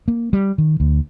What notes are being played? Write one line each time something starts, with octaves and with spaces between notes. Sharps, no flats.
A#3
G3
D#3
D2